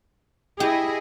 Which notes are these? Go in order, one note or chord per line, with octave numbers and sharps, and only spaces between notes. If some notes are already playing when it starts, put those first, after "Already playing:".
E4 G4 G#4 D#5